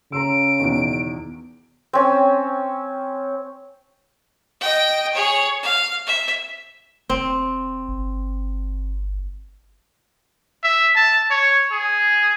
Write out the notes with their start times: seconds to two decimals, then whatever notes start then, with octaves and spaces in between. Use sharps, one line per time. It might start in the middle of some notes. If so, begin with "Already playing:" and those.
0.12 C#3 A#5 C6 E6 D7
0.60 E2 B2 D#3
1.93 C4 C#4
4.61 D#5 G5
5.13 G#4 C#5
5.63 F5
6.07 E5
7.09 E1 C4
7.89 G1
10.64 E5
10.96 A5
11.31 C#5
11.72 G#4